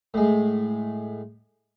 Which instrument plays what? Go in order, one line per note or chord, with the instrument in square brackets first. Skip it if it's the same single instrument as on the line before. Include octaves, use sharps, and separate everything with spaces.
[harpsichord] A2 G#3